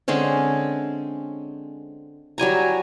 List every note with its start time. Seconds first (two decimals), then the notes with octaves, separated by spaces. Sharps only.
0.08 D3 G#3 C4 C#4
2.38 F#3 G3 G#5 A#5